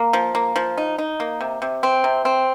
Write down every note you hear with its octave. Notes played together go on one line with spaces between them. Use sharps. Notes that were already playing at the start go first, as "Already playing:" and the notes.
Already playing: A#3
F3
A#3
F3
D#4
D#4
A#3
C3
C3
C4
C3
C4